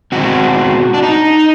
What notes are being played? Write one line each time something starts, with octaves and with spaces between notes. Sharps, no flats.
B2 G#3 C4 F#4
D4
D#4